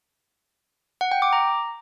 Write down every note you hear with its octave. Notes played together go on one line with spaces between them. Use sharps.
F#5
G5
D6
A#5